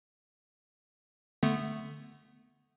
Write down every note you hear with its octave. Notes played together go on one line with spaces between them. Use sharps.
D3 A3 B3